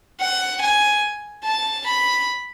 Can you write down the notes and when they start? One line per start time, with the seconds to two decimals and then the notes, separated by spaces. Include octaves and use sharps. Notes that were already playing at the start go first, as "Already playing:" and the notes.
0.20 F#5
0.61 G#5
1.43 A5
1.86 B5